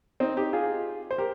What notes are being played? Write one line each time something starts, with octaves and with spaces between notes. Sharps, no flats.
C4 D#4
D#4 G4
F4 G#4
C5
G4 A#4